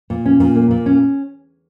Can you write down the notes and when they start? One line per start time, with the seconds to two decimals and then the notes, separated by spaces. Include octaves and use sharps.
0.10 A#2
0.26 C#4
0.40 A#2
0.56 A#3
0.71 A#2
0.86 C#4